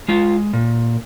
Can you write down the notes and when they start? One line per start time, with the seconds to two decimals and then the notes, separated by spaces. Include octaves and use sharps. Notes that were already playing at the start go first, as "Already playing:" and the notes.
0.08 G#3 F4
0.53 A#2